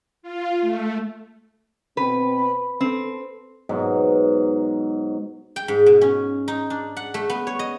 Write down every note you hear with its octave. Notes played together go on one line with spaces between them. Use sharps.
F4
A3
B2 C4 B4
C4 A4
G#2 B2 F#3
G5
G#2
B2
C#4
D#4
D4
F#5
A3
B3
C#5
D#5